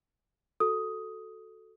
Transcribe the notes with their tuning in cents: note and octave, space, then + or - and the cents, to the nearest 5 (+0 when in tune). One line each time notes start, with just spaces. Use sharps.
F#4 +0 A4 +0 D#6 +5